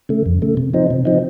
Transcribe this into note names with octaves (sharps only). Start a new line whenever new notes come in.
C#3 A3
F2
C#3 A3
C3
F3 C4 D#4
C3
F3 C4 D#4